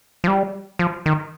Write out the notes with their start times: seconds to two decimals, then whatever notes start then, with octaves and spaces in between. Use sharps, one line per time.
0.24 F3
0.28 G3
0.79 F3
1.06 D#3